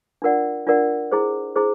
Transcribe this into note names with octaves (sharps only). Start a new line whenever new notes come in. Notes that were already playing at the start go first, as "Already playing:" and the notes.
D4 F4 A#4 D5 F#5
D4 F4 A#4 D5 F#5
E4 G#4 C5
E4 G#4 C5